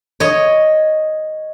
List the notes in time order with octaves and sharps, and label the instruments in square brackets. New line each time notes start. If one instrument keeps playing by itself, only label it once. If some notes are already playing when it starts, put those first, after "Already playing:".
[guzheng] C#5 D#5